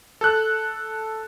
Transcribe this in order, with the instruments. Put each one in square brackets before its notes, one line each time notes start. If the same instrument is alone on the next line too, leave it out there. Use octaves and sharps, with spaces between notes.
[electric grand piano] A4 F#6